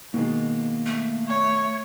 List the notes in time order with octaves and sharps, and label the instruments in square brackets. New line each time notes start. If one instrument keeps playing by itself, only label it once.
[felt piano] B2 D#3 G#3 [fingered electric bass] A#3
[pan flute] A3
[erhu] C#5